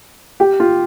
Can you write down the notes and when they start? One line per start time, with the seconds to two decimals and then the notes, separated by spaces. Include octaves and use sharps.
0.40 G4
0.60 F4